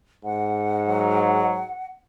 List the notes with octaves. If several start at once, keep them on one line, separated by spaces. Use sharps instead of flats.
G#2 F#5
F#3